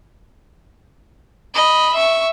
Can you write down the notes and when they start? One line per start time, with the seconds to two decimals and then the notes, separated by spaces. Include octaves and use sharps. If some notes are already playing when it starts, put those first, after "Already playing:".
1.54 D#5 B5
1.94 E5 C#6